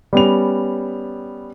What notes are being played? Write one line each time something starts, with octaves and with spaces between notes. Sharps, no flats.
G3 B3 C#4 F7